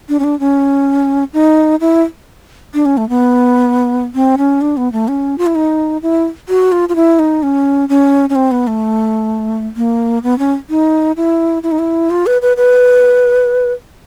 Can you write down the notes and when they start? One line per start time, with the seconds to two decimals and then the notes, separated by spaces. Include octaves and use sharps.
0.09 D4
0.19 C#4
0.24 D4
0.40 C#4
1.33 D#4
1.81 E4
2.74 D4
2.85 C#4
2.97 A3
3.09 B3
4.15 C4
4.38 C#4
4.61 D4
4.77 B3
4.92 A3
5.08 C#4
5.38 F4
5.47 E4
5.55 D#4
6.02 E4
6.49 F#4
6.72 F4
6.89 F4
6.96 E4
7.19 D#4
7.43 C#4
7.89 C#4
8.30 C#4
8.36 C4
8.51 B3
8.67 A3
9.76 A#3
10.23 B3
10.39 C#4
10.70 D#4
11.17 E4
11.63 E4
11.72 D#4
11.79 E4
12.10 F4
12.26 B4
12.42 B4
12.57 B4